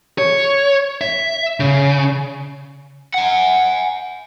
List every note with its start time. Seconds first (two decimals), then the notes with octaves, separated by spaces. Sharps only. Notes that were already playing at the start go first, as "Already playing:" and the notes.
0.18 C#5
1.01 E5
1.60 C#3
3.14 F#5 G#5